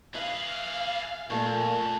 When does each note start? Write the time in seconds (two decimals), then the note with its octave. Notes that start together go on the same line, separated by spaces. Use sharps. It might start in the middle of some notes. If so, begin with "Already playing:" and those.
0.15 G#4 B4 E5 F5
1.30 F2 A#2 A3 C#6